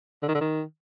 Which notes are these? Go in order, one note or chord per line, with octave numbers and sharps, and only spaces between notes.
D3
D#3
D3
D#3